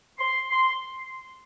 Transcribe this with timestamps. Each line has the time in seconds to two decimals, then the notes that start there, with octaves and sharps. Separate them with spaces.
0.19 C6
0.49 C6